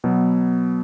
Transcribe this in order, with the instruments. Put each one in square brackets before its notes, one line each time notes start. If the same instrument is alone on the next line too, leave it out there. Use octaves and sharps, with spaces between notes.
[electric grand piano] B2 F#3 B3